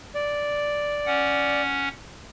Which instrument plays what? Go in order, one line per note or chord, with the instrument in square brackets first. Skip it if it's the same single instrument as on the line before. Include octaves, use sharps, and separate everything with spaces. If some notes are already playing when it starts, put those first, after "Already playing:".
[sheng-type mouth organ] D5
[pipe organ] C#4 F#5